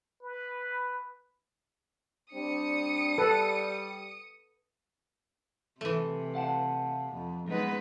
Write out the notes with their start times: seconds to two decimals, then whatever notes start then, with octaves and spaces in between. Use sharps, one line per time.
0.22 B4
2.34 G3 C4 D4 D#6 C#7
3.18 G3 A4 B4
5.81 C3 E3 A3
6.35 F5 F#5 A5
7.13 F2
7.48 F#2 G#3 B3 D#4 B4